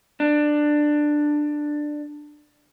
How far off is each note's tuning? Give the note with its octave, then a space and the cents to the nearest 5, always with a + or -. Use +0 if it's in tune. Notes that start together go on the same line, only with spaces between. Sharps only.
D4 +15